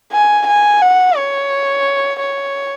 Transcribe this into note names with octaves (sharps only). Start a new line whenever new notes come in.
G#5
G#5
F#5
C#5
C#5